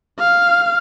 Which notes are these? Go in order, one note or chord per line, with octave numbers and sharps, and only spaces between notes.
F5